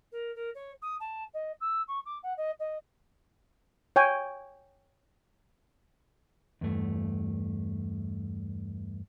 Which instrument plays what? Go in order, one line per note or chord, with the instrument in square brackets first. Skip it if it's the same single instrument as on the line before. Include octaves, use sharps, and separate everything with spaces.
[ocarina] A#4
A#4
C#5
D#6
A5
D#5
E6
C#6
D6
F#5
D#5
D#5
[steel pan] C#5 G5 G#5
[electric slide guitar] E2 G2 A3